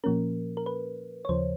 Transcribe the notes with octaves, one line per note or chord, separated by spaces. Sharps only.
A#2 F3 A#3 C#4 A#4
A#4
B4
C#5
D#2 C#3 F3 C5